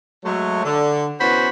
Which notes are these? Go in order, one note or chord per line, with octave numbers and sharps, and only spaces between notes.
F#3 G#3 A3
D3
E3 B3 C#4 F#4 C5 B5